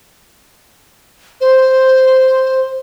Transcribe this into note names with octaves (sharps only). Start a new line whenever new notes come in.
C5